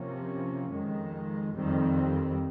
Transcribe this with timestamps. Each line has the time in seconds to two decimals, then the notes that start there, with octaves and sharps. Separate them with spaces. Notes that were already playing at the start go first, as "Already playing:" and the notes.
Already playing: C3 F3 A#3 C#4
0.72 F2 D#3 G#3
1.53 F2 D#3 G3 C4